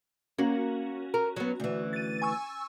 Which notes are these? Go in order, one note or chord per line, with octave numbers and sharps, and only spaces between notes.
A#3 C#4 F#4
A#4
F#3 B3
D2 E3
A6 D#7
G#5 C#6 E6